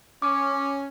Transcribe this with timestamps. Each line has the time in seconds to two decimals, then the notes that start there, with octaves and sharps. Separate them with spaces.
0.22 C#4 D6